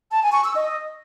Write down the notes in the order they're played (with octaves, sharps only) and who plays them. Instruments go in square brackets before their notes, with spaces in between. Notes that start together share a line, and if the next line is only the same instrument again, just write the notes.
[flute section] A5
G#5
C#6
E6
D#5